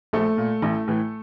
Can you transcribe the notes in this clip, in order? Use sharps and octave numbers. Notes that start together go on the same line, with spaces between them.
A#1 A3 A4
A#2
A1
A2 E3